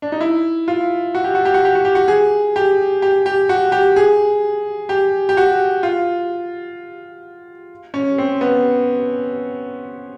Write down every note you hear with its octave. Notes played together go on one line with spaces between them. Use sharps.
D4
D#4
E4
F4
F#4
G4
F#4
G4
F#4
G4
F#4
G4
F#4
G#4
G4
G4
G4
F#4
G4
G#4
G4
G4
F#4
F4
C#4
C4
B3